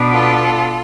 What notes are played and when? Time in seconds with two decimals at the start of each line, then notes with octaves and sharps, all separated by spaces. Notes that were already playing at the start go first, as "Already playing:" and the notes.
Already playing: B2 B3 D4
0.13 F4 A4